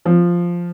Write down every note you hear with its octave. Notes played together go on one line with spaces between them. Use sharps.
F3